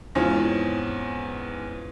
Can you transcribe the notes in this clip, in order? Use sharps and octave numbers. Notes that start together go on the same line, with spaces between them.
E2 G#2 F3 C4 C#4